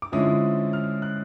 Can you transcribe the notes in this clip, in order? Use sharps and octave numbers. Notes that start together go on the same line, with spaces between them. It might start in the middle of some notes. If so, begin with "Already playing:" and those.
D6
D3 F3 G#3 C#4 E4 D#6
F6
F#6